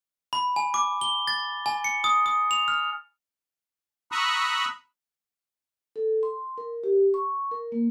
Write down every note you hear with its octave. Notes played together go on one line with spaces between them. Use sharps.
B5
G#5
D6
G7
A6
G#5
C#7
D#6
D#6
F7
F6
A#5 B5 C#6 D#6 E6 F#6
A4
C6
A#4
G4
C#6
A#4
A#3